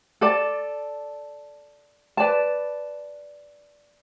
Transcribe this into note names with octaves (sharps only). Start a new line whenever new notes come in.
A4 D5 A5
B4 D5 A5